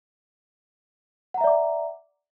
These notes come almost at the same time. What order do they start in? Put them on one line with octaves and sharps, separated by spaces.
F#5 A#5 E5 D5 D6